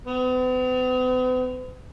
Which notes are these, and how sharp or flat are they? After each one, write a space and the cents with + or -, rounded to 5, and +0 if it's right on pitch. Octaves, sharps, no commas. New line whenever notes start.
B3 +45